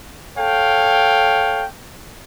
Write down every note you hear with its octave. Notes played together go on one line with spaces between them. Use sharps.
A4 C#5 F5 G5